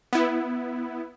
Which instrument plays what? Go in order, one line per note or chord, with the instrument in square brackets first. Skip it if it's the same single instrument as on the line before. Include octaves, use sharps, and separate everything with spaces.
[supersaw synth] B3 E4